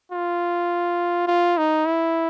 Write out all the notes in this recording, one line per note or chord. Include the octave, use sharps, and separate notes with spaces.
F4
F4
D#4
E4